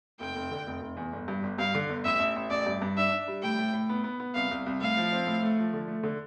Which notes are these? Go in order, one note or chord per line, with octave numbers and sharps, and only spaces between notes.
F1 G5
F1
D3
F1
F1
E2
G1
G2
G1
G2 F5
D3
G1
A1 E5
A1
A1
A1 D5
G2
G2
D4 E5
D4
G3
A2 G5
A2
A2
B3
B3
B3
C2 F5
C2
C2
A2 F5
F3
C4
A2
A3
F3
D3
A3
D3